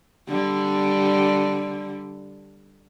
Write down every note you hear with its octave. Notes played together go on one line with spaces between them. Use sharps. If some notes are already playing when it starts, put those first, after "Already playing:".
D3 G3